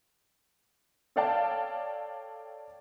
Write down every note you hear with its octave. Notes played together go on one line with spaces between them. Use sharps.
A4 C#5 D5 F5 G5 A5